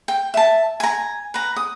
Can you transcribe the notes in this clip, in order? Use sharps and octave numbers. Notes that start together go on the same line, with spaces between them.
G5
E5 A5
G#5 A#5
B4 A#5
D#6